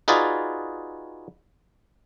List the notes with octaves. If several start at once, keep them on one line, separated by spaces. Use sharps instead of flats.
D#4 F4 F#4 G#4 B4 D5